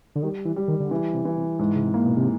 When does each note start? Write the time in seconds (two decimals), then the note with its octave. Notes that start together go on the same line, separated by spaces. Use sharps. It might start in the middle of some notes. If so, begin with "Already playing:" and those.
0.16 D3
0.22 D#3 G3
0.45 E3
0.56 G3
0.68 D#3
0.80 D3
0.91 C#3 E3
1.14 C3
1.25 E3
1.37 C3
1.59 G#2
1.75 C#3
1.83 C3
1.94 A#3
2.05 B2
2.16 C3